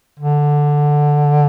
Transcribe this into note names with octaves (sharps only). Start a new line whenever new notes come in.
D3